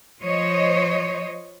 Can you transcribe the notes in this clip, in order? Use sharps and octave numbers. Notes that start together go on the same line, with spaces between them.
F3 C5 C#5 D#5